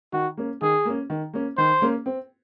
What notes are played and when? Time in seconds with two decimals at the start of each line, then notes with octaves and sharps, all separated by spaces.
0.13 D#3 F#4
0.38 A#3 C#4
0.62 D#3 G#4
0.85 A#3 C#4
1.10 D#3
1.34 A#3 C#4
1.57 D#3 C5
1.82 A#3 C#4
2.06 C4